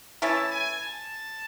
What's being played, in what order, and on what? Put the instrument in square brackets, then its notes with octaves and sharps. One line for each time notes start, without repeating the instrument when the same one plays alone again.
[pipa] E3 A3 C#4 E4 [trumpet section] A5
[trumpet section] G#5
A5